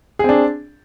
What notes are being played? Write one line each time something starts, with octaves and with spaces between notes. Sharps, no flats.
C4 D4 G#4